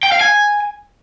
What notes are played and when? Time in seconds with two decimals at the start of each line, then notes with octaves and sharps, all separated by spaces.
0.03 G5
0.12 F5
0.21 G#5